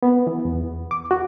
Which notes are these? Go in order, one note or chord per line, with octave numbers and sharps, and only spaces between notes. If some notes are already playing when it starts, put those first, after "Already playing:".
B3
E3
E2
D6
F#4